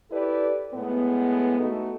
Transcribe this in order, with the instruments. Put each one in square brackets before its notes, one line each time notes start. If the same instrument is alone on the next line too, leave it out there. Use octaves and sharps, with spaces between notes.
[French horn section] E4 G4 A4 B4 D5
A2 G#3 B3
A3 B3 D#4 F#4 A4